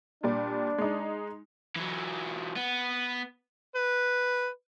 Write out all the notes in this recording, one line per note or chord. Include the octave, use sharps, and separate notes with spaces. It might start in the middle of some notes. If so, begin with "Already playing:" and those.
A#2 G3 D4 D5
G#3 D#4
E3 F#3
B3
B4